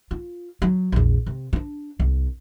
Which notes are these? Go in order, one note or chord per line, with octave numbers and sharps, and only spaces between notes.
F4
F#3
A#1 E2
C3
C#4 D4
C2